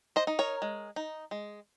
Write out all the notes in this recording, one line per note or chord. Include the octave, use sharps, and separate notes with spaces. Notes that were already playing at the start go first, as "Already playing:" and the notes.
C5 D#5
D#4
A#4 C#5
G#3
D#4
G#3